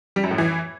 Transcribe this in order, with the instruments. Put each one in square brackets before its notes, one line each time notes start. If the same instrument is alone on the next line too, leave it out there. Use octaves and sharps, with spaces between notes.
[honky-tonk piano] G3
F#2
A2
E3